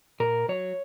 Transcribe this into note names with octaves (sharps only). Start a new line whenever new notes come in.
A#2 A#4
F#3 C#5